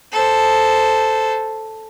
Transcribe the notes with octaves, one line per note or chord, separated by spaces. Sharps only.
A4 C5